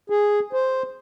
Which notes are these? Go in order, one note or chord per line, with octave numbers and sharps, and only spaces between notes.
G#4
C5